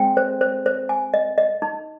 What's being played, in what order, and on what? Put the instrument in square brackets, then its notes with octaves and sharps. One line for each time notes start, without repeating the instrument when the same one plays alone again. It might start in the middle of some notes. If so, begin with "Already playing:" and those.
Already playing: [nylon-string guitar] G#3 C4 [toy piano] G5
[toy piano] C5
C5
C5
G#5
D#5
D#5
D#4